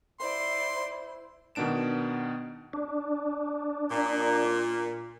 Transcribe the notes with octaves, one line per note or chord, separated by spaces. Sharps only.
E4 C5 D5 C6
B2 D#3 B3 D4 D7 E7
D4
A#2